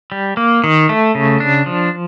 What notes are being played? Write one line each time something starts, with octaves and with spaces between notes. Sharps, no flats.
G3
A#3
D#3
A3
C#3
D4
F3